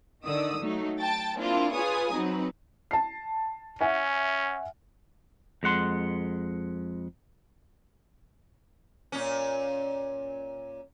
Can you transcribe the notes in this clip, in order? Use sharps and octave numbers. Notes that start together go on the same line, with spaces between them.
D3 D#3 D5 D#6 E6
F#3 A3 D#4
G5 A5 A6
A#3 C4 D4 E4 F4
F4 G#4 B4 C#5 G#5 D#6
F#3 C4 D#4 B4
A5 C7
C#4 E5 F#5 G#5
F2 G#3 F#5 C6
A#2 C#4